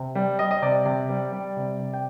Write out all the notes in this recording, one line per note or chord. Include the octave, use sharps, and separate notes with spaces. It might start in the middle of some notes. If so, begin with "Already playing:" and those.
Already playing: C3
G3
G3 D#5
D#5
C3 D5
C3
G3
G3
C3
C3
G5